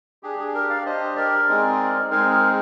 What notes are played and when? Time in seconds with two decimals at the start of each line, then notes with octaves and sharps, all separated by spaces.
0.23 D4 G4 G#4
0.39 G#4
0.55 A#4
0.69 D5 F5
0.86 D4 G4 C5 D#5
1.16 A#4 D5
1.48 G#3 C4 D#4 G#4
2.10 G#3 C4 D#4 G#4 A#4
2.31 A#4